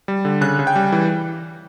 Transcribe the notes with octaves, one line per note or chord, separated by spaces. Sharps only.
G3
D3
C#3 F#6
C#3
G5
G3
E3